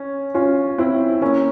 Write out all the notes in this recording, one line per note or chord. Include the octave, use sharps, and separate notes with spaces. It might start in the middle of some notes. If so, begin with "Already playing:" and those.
Already playing: C#4
C#4 F4
C4 E4
A#3 C#4